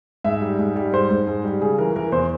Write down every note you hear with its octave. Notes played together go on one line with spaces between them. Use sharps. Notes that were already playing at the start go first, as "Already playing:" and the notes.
G#2 E5
G3
G#2
G3
G#2 C5
G#2
G#2
G3
C#3 G#4
E3 A#4
E3 A#4
E2 C5